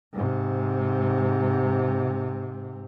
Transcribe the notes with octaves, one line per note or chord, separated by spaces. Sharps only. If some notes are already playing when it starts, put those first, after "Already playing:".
G#2 C3